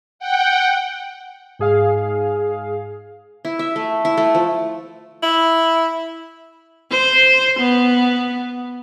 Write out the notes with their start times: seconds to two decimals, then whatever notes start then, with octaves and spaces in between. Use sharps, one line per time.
0.19 F#5 G5
1.59 G#2 G#4 F5
3.45 E4
3.59 E5
3.76 A3
4.05 E4
4.17 A3
4.35 F3
5.23 E4
6.91 C5
7.60 B3